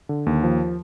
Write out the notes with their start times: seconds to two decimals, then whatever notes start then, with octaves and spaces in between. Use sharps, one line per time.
0.09 D3
0.26 D#2
0.43 F3